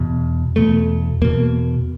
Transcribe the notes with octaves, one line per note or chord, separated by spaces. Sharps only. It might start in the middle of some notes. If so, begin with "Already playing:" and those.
Already playing: E2 B2
E2 B2 A3
E2 B2 A#3